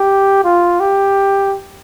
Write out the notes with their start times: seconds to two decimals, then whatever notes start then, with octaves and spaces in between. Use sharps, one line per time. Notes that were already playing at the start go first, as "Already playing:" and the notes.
Already playing: G4
0.44 F4
0.80 G4